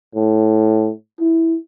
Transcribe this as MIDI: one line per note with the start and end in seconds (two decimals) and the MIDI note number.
0.15 0.90 45
1.20 1.56 64